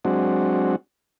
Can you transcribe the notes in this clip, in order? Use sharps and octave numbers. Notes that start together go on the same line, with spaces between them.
F#3 G#3 C4 D4 F#4